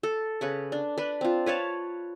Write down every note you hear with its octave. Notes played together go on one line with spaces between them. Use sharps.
A4
C#3 B4 C#6
D4
D4 B4
C4 F4
B4 C#5 F5 A5